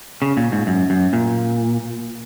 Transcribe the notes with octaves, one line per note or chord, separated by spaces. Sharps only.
C#3
A#2
G#2
F#2
F#2
A#2